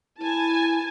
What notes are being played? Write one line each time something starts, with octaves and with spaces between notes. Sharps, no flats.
E4 G#5 A5